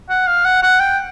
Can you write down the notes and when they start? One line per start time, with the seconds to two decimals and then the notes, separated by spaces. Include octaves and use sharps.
0.10 F#5
0.27 F5
0.45 F#5
0.63 F#5
0.79 G5